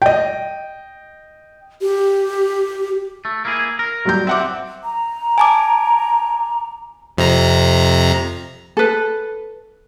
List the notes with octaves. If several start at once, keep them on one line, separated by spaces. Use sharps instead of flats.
D#5 G5
G4
A3
A#3 E4 G#4
A#4
F#3 G3 G6
C4 E5 F#5 D6
A#5
G#5 A5 D6
F2 C3 A#5
A4 B4